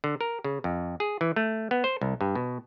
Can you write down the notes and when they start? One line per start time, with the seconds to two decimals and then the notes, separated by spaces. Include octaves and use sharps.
0.04 D3
0.21 A#4
0.44 C#3
0.64 F2
1.00 G#4
1.21 E3
1.36 A3
1.71 B3
1.84 C5
2.01 C2
2.21 G2
2.35 B2